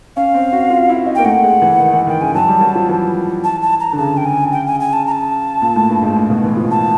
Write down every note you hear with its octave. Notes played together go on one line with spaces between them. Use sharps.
C#4 F5
C4
F#4
F4
E4
D#4
A#3 G5
A3 F#5
G#3
E3
D#3
E3
D#3 G5
C#3 G#5
F#3 A5
G3
F#3
F3
E3
A5
A5
A#5
D3
C#3 A5
G5
G#5
G5
G#5
G#5
A5
A#5
A5
A#2
A2
G2
G#2
A2
B2
E3
F3
A5